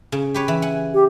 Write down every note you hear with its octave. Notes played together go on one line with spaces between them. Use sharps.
C#3
G4 B4 C#5
E3
F#5 G#5
G4